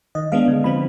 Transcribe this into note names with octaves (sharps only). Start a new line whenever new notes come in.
D#3 D#5
G#3 B3 D4 F5
D3
F3 C4 B5